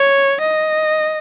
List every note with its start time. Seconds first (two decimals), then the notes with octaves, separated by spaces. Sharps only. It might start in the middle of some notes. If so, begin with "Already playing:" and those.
Already playing: C#5
0.41 D#5